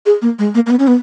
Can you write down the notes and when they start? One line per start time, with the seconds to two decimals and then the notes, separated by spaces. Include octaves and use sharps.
0.06 G#4
0.22 A#3
0.39 G#3
0.55 A#3
0.66 A#3
0.70 B3
0.79 C#4
0.87 B3